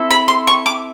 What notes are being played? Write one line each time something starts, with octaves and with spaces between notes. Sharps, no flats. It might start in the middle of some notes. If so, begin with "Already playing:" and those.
Already playing: C4 E4 A4
B5
C6
C#6
D6